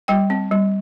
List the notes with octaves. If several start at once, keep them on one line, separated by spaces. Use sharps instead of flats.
G3 G5
C4
G3